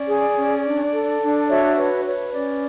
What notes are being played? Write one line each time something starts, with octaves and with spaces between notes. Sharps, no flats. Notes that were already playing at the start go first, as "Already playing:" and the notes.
Already playing: C#4 D5
G#4
C#4
D4
A4
D4
F#4 C#5 E5
B4 C#5
B4 C#5
C#4 D5